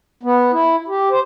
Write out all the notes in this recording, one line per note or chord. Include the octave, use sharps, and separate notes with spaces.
B3
E4
G4
C5